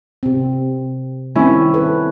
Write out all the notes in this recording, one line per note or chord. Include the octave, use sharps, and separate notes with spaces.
C3 C4
D#3 G3 C4 C#4 E4
A4 B4